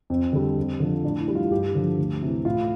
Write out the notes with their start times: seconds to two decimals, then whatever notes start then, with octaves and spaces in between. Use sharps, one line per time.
0.10 F2 C4
0.33 D3 G3
0.58 F2
0.80 D3 F3
1.04 A2 D4
1.20 E4
1.28 E3 G3
1.35 F4
1.51 G2 G4
1.75 D3 F3
1.98 D2
2.22 C3 E3
2.45 A2 F4